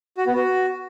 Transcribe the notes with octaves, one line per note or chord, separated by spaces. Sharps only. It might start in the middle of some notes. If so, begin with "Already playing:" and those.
F#4
B3
F#4